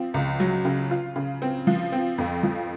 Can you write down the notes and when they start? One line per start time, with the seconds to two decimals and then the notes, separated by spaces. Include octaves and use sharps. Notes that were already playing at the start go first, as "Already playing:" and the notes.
Already playing: F3 C4
0.14 C#2
0.40 F#3
0.65 C#3
0.91 F4
1.16 C#3
1.42 C4
1.67 F3
1.92 C4
2.18 F2
2.43 F3